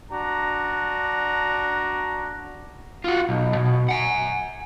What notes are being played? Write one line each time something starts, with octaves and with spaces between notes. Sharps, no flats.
D4 F#4 A#5
F4 F#4
B1
B2
F#5 G#5